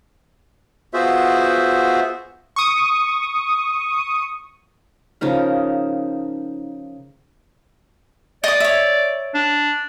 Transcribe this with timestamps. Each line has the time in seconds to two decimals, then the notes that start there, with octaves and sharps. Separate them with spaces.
0.94 B3 F4 F#4 G#4 C5 E5
2.56 C#6 D#6
5.21 C#3 F3 D#4 A#4
8.44 D5 D#5 D#6
8.60 C#5 E5
9.35 D4